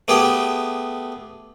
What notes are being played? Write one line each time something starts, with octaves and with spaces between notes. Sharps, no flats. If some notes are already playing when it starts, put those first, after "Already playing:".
A3 B3 G4 G#4 G5